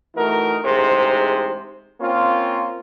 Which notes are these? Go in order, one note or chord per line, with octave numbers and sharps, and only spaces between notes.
E3 A3 D#4 F#4 A#4
A1 G#2 C3 G#3 C5
A#3 C4 C#4 F4